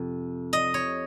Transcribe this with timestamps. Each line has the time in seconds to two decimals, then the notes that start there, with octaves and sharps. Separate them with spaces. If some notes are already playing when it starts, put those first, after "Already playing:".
Already playing: F2 C3
0.53 D#5
0.74 C#5